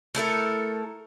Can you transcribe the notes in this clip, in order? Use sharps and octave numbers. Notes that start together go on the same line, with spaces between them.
A3 E4 A4 A#4